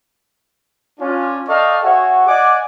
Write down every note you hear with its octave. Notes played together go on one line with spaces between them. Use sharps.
C#4 D4 F4
A4 D5 D#5 F5 G5 C#6
F#4 G#4 C#5 E5 F#5
D5 D#5 F#5 G#5 D6